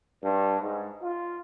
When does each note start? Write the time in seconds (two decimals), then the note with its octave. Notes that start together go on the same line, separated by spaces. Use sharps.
0.23 G2
0.60 G#2
1.02 F4